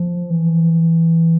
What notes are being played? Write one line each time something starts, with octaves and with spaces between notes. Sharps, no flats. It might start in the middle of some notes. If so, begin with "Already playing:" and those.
Already playing: F3
E3